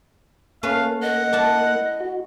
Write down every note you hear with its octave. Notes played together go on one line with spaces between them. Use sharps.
A3 A#3 C#4 B4 F5
D#5 F#5
D4 E4 A5
F#4